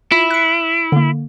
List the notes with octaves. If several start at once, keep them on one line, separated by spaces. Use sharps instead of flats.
E4 F4
F#6 C#7
D3 A#3